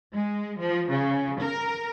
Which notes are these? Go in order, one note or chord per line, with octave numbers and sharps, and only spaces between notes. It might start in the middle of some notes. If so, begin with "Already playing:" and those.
G#3
F3
C#3
A#4